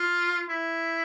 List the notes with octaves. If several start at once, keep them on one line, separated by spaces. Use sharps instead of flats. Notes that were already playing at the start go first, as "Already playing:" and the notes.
Already playing: F4
E4